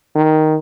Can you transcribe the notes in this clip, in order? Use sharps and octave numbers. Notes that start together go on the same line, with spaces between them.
D#3